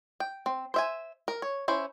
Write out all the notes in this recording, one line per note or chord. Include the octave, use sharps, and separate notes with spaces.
G5
C4
C5 E5 G#5
A#4
C#5
C#4 E4 C5